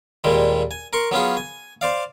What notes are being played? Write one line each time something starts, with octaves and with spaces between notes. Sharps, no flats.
D#2 A#2 G3 G#3
G#5
A#4 C6 C#6
F#3 B3 C#4 F4 G#4
G#5
C5 D5 F5